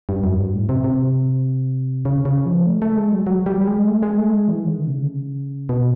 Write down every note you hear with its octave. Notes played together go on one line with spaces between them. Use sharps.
G2
F#2
G2
A2
C3
C3
C#3
C#3
F3
A3
A3
G#3
F#3
F#3
G3
G3
G#3
A3
G#3
A3
G#3
E3
D#3
D3
C3
C#3
B2